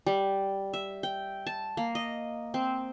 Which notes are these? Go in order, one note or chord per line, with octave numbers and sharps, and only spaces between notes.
G3
E5
G5
A5
A#3
D#5
C4